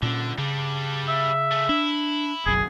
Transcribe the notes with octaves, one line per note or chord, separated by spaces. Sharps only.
A#2 D3 C#4
C#3 G3 D4
E5
A3 G#4
D4 E4
F#1 B1 F#2 G#4